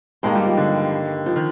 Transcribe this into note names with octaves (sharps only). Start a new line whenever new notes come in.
G2 D#3 G#3 A#3
G3
F3
D3
F3
D#3